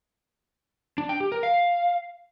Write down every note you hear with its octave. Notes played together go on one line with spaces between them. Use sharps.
D4
G5
G4
A#4
F5